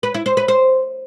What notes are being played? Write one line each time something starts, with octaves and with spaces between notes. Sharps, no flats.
B4
E4
C5
B4
C5